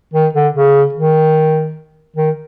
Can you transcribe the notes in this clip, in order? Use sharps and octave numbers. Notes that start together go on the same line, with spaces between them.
D#3
D3
C#3
D#3
D#3